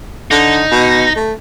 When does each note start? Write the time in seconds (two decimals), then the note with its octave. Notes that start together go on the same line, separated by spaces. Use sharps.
0.31 D3 D#4
0.71 B2
1.16 A3